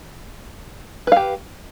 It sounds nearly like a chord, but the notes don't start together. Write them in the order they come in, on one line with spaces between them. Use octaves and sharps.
B4 F5 G4